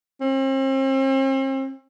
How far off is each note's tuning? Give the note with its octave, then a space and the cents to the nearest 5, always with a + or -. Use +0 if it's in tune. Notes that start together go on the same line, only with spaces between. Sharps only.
C4 +40